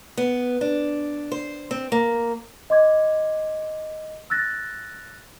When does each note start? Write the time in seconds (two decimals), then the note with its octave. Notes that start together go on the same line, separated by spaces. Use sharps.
0.17 B3
0.61 D4
1.32 C5
1.71 C4
1.92 A#3
2.70 D#5 C6 D6 G#6
4.30 E6 F#6 A6 A#6